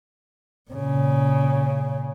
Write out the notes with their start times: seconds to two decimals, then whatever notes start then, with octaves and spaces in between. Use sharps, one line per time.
0.70 A#2 C#3